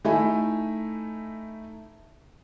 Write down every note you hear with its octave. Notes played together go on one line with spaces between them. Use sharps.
A3 D#4 E4 E5 G#5